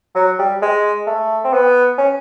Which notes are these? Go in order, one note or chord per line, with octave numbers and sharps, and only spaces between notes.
F#3
G3
G#3
A3
C4
B3
C#4